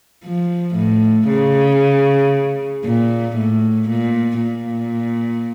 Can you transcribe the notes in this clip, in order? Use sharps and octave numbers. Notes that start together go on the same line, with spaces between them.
F3
A2
C#3
A#2
A2
A#2
A#2